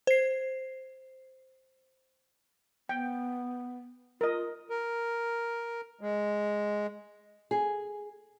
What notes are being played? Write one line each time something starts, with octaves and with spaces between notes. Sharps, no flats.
C5 C7
B3 G5
F4 A#4 D#5
A#4
G#3
G#4